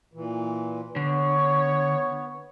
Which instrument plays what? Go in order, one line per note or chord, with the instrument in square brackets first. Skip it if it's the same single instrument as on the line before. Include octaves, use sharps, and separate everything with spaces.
[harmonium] A#2 E3
[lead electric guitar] D3 [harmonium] B3 [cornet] C#5